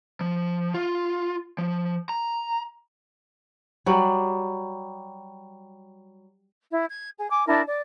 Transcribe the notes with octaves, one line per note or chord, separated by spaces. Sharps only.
F3
F4
F3
A#5
F#3 G3
E4
G#6
G#4
G#5 D6
D4 E4 A#4 A5
D5